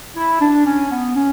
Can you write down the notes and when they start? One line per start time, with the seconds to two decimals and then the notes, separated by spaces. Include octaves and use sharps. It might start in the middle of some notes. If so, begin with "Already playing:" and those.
0.16 E4
0.41 D4
0.66 C#4
0.91 B3
1.15 C#4